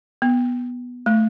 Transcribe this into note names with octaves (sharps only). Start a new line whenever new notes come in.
B3
A3